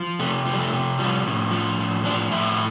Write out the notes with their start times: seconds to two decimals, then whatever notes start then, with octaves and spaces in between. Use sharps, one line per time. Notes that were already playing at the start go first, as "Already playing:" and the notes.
Already playing: F3
0.19 C3 A3
0.46 F3
0.53 G3
0.59 A3
0.73 C3
0.98 F3 G3
1.26 A2
1.51 F3
1.79 A2
2.04 F3 D4
2.31 A2 E4